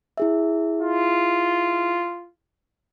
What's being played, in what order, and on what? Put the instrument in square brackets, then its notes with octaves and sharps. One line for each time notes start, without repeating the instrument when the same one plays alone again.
[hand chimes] E4 G#4 E5
[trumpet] F4